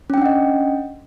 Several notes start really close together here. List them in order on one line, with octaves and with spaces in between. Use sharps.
C#4 G5 D4 F#5 D#5